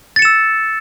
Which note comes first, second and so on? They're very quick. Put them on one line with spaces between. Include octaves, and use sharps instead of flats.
A6 C#7 E7 E6